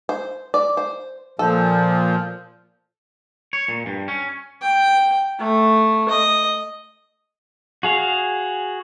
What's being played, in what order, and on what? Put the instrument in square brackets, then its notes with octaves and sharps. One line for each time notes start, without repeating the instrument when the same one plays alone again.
[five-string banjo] C5
D5
C5
[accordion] A#2 F3 [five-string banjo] A4
[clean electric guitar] C#5
A#2
G2
C#4
[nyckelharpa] G5
A3
D#5
[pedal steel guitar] F#4 G#4 F5